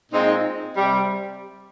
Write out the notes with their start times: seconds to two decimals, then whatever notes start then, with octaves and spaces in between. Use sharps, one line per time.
0.11 A#2 G#3 C4 D#4
0.76 C3 G3